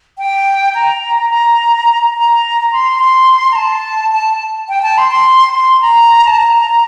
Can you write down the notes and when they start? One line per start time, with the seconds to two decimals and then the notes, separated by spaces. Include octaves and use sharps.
0.18 G5
0.75 A#5
1.30 A#5
2.15 A#5
2.72 C6
3.00 C6
3.52 A#5
3.56 A5
4.12 A5
4.69 G5
4.83 A5
4.98 C6
5.11 C6
5.54 C6
5.81 A#5
6.27 A5
6.38 A#5